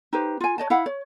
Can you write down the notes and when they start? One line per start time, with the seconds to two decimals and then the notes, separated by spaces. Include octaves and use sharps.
0.13 D#4 G4 B4 C5
0.40 F4 G#5
0.58 C#5 D#5 A5
0.70 E4 F5 F#5 B5
0.86 C#5